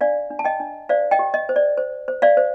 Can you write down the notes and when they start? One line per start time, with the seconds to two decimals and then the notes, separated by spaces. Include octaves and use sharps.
0.01 D4 D5 F5
0.31 D4
0.39 A5
0.44 D#5 G5
0.60 D4
0.89 C5 D5 F5
1.11 D#5 G5
1.19 G4
1.34 D#5
1.49 C5
1.56 D5
1.77 C5
2.08 C5
2.22 D5 F5
2.37 C5